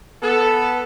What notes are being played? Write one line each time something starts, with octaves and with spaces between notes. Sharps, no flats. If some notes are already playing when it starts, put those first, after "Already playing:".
B3 A4